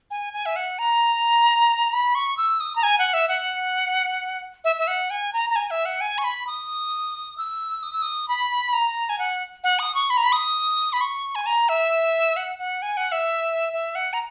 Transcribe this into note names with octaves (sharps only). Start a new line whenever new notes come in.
G#5
G#5
E5
F#5
A#5
B5
C#6
E6
D#6
A#5
G#5
F#5
E5
F#5
E5
E5
F#5
G#5
A#5
A#5
G#5
E5
F#5
G#5
C#6
B5
D#6
E6
D#6
E6
D#6
B5
A#5
G#5
F#5
F#5
D#6
C#6
B5
A#5
B5
D#6
B5
C#6
G#5
A#5
E5
F#5
F#5
G#5
F#5
E5
E5
F#5
A#5